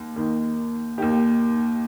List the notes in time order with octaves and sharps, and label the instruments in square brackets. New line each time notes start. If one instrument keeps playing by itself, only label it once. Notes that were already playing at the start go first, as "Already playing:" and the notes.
Already playing: [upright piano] D#2
D#2 D#3
D#2 D#3 G4